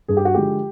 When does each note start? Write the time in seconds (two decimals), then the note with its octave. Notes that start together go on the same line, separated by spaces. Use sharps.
0.08 G2 G#4
0.17 G4
0.25 F#4
0.34 D3 F3 G#3 G4